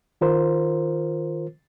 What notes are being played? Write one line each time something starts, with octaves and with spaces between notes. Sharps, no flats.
D#3 F4 A#4 C5